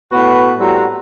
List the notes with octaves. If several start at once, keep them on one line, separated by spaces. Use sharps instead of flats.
A2 B3 F#4 B4
A2 G3 C4 F#4 F#5 A#5